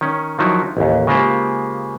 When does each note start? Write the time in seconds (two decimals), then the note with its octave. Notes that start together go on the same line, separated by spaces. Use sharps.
0.01 D#3 C#4
0.39 D#3 F3 F#3 D#4 E4
0.77 A1 D#2
1.07 C#3 G#3 A#3 F4 G4 C5